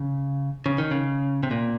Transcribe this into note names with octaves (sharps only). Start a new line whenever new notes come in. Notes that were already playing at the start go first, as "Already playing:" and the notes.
Already playing: C#3
C#3
D#3
C#3
C3
A#2